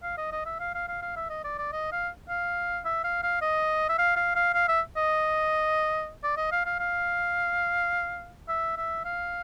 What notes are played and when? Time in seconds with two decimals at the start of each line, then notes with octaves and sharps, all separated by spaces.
0.03 F5
0.17 D#5
0.32 D#5
0.46 E5
0.60 F5
0.75 F5
0.88 F5
1.02 F5
1.16 E5
1.30 D#5
1.44 D5
1.58 D5
1.72 D#5
1.92 F5
2.29 F5
2.85 E5
3.04 F5
3.23 F5
3.42 D#5
3.89 E5
3.98 F5
4.16 F5
4.35 F5
4.54 F5
4.68 E5
4.97 D#5
6.24 D5
6.37 D#5
6.52 F5
6.65 F5
6.80 F5
8.48 E5
8.77 E5
9.05 F5